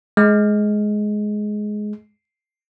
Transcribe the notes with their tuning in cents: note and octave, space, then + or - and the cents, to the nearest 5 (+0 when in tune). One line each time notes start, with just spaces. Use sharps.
G#3 +15